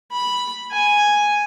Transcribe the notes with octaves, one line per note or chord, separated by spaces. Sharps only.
B5
G#5